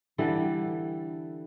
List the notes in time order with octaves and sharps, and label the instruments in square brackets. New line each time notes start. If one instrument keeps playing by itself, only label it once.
[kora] D3 E3 G3 A4